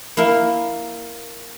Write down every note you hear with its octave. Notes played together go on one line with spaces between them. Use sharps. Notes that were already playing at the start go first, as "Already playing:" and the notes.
A#3 E4 A#4